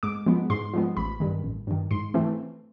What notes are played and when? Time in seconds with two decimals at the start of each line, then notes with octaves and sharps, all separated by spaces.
0.03 G#2 D6
0.26 F3 G#3 B3
0.50 G#2 C6
0.73 F3 G#3 B3
0.97 A1 B5
1.20 G2 D#3
1.44 A1
1.67 G2 D#3
1.91 G#2 C6
2.14 E3 A3 C4